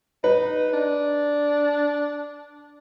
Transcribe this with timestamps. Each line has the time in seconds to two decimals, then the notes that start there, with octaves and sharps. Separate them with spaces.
0.24 D#4 B4
0.74 D4